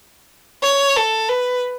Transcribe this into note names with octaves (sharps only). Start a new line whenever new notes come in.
C#5
A4
B4